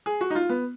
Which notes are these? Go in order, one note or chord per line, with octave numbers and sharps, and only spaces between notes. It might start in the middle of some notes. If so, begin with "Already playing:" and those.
G#4
F#4
D#4
F4
B3